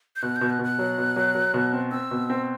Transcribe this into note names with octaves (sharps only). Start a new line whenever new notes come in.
G6
B2 F#6
G6
B2
F#6
B2
F#6
F#3
B2
F#3
F#3
B2
C4
C4 E6
B2
C4